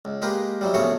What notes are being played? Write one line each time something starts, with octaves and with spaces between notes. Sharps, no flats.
C#2
G#3 A#3 G4 B4
E3 F#3 G3
A#1 C#3 A3 B3 F#4 C#5